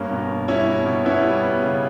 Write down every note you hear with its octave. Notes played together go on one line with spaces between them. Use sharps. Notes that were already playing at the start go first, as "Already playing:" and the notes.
Already playing: G2 A#3 C#4
B2
B2
G3 C#4 E4
B2
B2
B3 C#4 E4
G3
B3
C#3